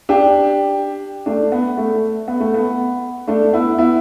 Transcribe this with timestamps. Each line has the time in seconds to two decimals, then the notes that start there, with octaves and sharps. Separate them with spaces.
0.09 D4 G4
1.26 A3 D4
1.52 B3
1.77 A3
2.28 B3
2.40 A3
2.54 B3
3.28 A3 D4
3.53 B3 E4
3.78 B3 E4